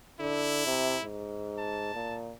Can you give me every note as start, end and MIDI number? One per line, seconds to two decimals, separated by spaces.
0.20 0.64 50
0.20 1.03 64
0.66 0.96 48
1.03 1.91 44
1.58 2.19 81
1.94 2.33 46